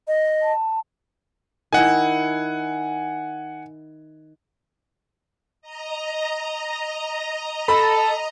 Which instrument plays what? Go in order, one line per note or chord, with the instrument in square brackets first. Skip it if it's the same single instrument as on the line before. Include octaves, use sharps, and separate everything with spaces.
[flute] D#5
[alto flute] A5
[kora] D#3 E4 [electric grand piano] F#5 G#5
[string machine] D#5 A#5
[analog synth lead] A4 [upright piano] B5